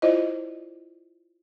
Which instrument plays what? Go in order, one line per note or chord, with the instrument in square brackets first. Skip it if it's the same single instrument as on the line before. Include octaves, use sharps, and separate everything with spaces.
[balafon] E4 F4 C5 D5 D#5